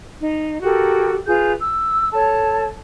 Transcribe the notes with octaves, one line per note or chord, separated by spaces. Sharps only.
D#4
F#4 G4 A4 A#4
F4 G#4 B4 G6
E6
A4 C#5 A5